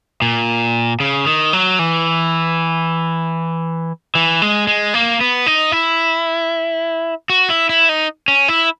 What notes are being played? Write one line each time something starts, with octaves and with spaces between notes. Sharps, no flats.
A#2
C#3
D#3
F#3
E3
E3
G#3
G#3
A#3
B3
D#4
E4
F#4
E4
E4
D#4
C#4
E4